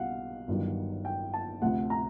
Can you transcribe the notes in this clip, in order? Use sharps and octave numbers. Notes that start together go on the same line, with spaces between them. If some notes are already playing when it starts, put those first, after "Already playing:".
Already playing: B1 G3 F5 F#5
G1 G2 D#3 F#3
G5
A5
D2 C3 F3 F#5
A#5